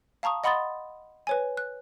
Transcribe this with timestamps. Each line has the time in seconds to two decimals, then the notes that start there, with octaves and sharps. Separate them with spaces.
0.23 F5 A5 A#5 C#6 D#6
0.44 D#5 F#5 B5 C6 D#6 A6
1.27 B4 C#5 G#5
1.57 F#6